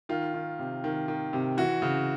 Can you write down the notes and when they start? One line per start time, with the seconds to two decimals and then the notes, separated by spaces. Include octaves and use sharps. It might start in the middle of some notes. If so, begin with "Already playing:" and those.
0.09 D#3 F4
0.34 D#3
0.59 C3
0.84 D#3
1.08 D#3
1.33 C3
1.57 E3 F#4
1.82 C#3